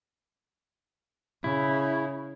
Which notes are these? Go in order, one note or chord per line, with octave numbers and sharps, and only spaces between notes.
C#3 E4